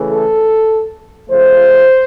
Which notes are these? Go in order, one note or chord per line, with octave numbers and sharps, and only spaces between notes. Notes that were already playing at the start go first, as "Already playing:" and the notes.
Already playing: C#3 E3 A3
A4
C#3 F3 A3 C5